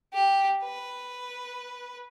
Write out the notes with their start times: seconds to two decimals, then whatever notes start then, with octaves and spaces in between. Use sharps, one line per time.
0.14 G4
0.64 B4